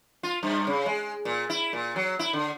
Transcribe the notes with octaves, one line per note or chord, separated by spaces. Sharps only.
F4
G2
C#3
G#3
A#2
E4
A#2
F#3
E4
D3